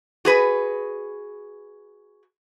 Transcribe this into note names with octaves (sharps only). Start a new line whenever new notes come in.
F#4 G#4 B4